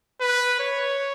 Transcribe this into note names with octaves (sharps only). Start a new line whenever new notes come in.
B4
C#5